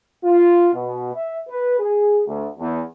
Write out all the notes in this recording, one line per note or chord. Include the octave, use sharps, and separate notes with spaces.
F4
B2
E5
B4
G#4
D2
E2